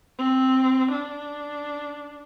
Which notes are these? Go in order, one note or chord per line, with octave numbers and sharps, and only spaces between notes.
C4
D4